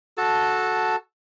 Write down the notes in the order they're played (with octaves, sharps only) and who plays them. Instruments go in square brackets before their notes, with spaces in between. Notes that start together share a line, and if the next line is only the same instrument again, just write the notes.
[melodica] F#4 A4 A5